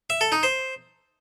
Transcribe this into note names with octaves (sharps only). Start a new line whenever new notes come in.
E5
A4
D#4
C5